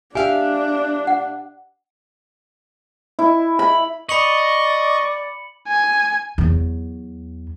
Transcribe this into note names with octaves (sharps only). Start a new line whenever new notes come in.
D4 G4 E5 F5 G#5
F#5
E4
B5
D5 D#5 B5 C#6 C#7 F#7
G#5
E2 F#3